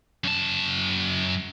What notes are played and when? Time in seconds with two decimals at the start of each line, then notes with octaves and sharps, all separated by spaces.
0.24 F#2 A5